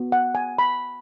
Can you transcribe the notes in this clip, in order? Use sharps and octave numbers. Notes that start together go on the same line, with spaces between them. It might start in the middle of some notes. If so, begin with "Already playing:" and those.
Already playing: B3 F#4
F#5
G#5
B5